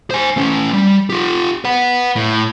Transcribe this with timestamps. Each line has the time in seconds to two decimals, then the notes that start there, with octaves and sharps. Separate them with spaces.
0.11 C5 G#5
0.37 A3 C#4
0.73 G3
1.10 F4 G4
1.65 B4 F#5
2.16 A2